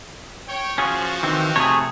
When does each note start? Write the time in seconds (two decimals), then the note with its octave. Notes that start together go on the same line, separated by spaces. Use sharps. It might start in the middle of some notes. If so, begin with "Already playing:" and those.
0.47 C#5 G5
0.78 F3 C#4 F4 F#4 G#4
1.23 D#3 E3 C4
1.56 C3 A3 G#4 C#5